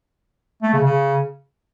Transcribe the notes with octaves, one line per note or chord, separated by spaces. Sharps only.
A3
C#3
C#3